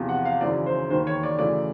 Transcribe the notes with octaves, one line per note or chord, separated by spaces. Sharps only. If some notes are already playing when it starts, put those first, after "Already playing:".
Already playing: E2 C3 F3
F#5
F5
G#1 F#2 C#3 E3 D5
C5
E1 D#2 D#3 C5
C#5
D5
F#2 C#3 E3 A3 D5